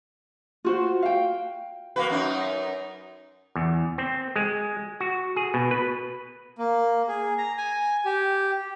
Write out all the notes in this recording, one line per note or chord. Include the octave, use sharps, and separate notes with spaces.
F4 F#4 C5
F5 G5
A#3 F#4 B4
F#2 D#4
E2
C4
G#3
F#4
G#4
B2
B4
A#3
G#4
A#5
G#5
G4